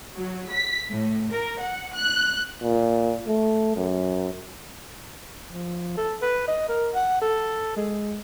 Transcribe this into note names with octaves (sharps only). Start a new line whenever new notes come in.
F#3
B6
A2
A#4
F#5
F#6
A#2
A3
F#2
F3
A4
B4
D#5
A#4
F#5
A4
G#3